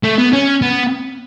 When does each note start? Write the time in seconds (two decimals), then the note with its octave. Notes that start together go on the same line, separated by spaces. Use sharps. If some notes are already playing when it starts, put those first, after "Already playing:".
0.04 A3
0.18 B3
0.33 C#4
0.62 B3